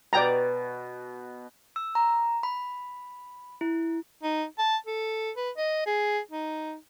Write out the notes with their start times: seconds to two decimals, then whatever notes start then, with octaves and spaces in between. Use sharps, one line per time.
0.13 B2 D5 G5 A#5
1.76 E6
1.95 A#5
2.43 B5
3.61 E4
4.23 D#4
4.59 A5
4.86 A4
5.37 B4
5.57 D#5
5.86 G#4
6.31 D#4